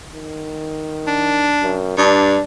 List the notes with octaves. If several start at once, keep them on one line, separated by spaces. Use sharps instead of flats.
D#3
D4
F#2
G2 D4